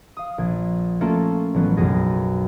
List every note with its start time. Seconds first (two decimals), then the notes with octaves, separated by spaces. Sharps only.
0.17 F5 D#6
0.38 A#1 G#6
1.01 A3 A#3 C#4 F4 A4
1.54 A1 F#3 B3 C#4
1.77 B1 F#2 G#4 A#6